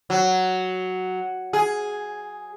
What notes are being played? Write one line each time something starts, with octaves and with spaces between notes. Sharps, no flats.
F#3
G#4